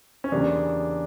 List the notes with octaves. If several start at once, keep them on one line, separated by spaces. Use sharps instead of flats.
C#4
E2 C#3 G3 A#3 D4